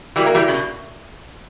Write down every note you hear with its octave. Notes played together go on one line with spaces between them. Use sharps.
E3 G3 F#4 A#4 D5
A#3
E3 G3
C#3
B2